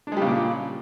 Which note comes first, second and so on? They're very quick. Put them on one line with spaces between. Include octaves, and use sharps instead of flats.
D4 G#3 G3 C#3 A#2